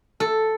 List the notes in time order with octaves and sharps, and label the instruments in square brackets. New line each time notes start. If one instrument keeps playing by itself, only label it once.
[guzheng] A4